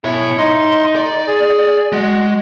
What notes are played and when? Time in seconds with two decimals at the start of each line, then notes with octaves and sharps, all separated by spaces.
0.05 B2 E4 C#5
0.39 D#4 C6
0.96 D5
1.28 G#4
1.92 G#3 F#4